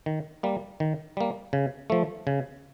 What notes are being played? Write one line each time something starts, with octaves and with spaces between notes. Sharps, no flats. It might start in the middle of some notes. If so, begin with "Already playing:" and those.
D#3
G3 A#3
D#3
G3 A#3
C#3
F3 A3
C#3